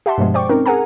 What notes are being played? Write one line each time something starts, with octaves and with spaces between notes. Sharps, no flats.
G4 E5 F#5 A5 C6
G2 B2 F3 G#3
C5 D5 G5 C#6 D6
C4 C#4 D#4 A#4
G#4 A#4 F#5 G#5 A#5